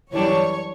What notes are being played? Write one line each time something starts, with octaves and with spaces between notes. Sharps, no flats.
F#2 E3 G3 D4 C#5